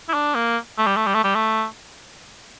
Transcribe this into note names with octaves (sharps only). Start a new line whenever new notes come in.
E4
D4
A#3
A3
G3
A3
G3
A3
G3
A3